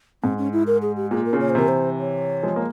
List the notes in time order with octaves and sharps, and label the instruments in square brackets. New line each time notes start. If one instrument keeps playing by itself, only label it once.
[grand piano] G#2 [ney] C4
[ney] C#4
E4
A#4
G#4
G4
[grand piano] A#2 [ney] G#4
[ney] A#4
[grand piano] A#2 C#3
[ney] C#5
C5
[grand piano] C3 E3 [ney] A#4
[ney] C5
C#5
[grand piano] F3 G#3
A#3